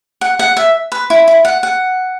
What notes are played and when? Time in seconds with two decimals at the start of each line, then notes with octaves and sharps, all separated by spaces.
0.21 F#5
0.39 F#5
0.57 E5
0.92 B4
1.10 E4
1.28 E4
1.45 F#5
1.63 F#5